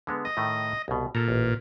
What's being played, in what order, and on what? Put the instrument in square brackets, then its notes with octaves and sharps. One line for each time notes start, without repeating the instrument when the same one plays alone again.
[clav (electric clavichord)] D3 G#3 B3
[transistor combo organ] D#5
[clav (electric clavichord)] A2 D#3 A3
C2 B2
[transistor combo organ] A#2 [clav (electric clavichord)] A4 A#5
[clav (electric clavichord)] A1